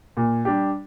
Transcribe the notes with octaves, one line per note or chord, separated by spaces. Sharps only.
A#2
G3 D4 G4